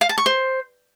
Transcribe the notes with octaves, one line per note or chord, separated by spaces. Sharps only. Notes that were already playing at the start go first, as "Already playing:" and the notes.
F5
A5
C#6
C5